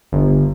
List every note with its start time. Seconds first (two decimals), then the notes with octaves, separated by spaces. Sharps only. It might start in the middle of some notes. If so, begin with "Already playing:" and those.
0.12 G1